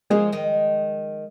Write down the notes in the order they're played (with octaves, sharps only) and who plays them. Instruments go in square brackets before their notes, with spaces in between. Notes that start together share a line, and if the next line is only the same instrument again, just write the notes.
[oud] F3 A#3 [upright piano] G#3 G#4
[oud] D#3 G#3